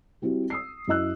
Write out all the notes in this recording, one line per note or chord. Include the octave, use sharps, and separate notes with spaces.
G3 C4 E4 F#4
D#6 E6 C7
F#2 E4 D#5 E6 F#6